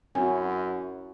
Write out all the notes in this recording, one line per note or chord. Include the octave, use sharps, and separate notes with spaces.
F#2 C4 C#4 E4 F#4 G#5